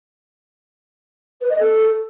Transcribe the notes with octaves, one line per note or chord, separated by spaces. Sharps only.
B4
D#5
A4